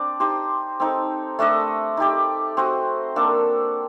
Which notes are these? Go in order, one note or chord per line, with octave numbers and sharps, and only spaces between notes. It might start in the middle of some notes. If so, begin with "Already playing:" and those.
Already playing: C4 D4 D5
D#4 G4 C5 D#5
C4 D#4 A4
A3 D4 A4 D#5
D#4 G4 D5
C4 F#4 C5 D#5
A#3 D4 A4 D5